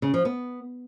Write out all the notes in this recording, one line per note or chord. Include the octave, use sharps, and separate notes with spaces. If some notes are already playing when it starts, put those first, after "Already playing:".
C#3
F3
B3